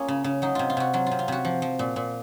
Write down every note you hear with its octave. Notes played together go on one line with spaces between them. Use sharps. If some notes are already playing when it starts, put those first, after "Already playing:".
Already playing: A#3 C#4 F4 G#4
C#3
C#3
F#3 D#4
C3 F4
F4
C3 F#4
F#3 F4
C3 F4
F4
C3 F#4
F3
F3
A#2
A#2